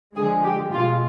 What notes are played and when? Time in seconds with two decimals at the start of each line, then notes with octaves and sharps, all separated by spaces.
0.16 D3 F3 G#3 G#4
0.44 G4
0.73 B2 G#3 F4